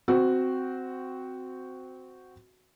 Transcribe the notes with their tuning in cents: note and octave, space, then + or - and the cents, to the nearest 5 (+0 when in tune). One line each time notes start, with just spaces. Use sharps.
C4 -15 F#4 +0